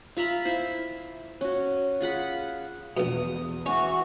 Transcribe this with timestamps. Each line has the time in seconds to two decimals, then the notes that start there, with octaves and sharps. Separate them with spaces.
0.17 F4 E5 A#5 B5
0.45 E4 C5
1.41 C#4 F#4
2.01 F4 G#4 F#5 B5
2.97 A#1 E2 B2 D#6
3.66 E3 C#4 F#4 C#6